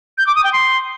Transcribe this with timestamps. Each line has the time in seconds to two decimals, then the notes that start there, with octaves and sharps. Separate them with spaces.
0.18 G6
0.27 D6
0.35 D#6
0.44 G5
0.53 C6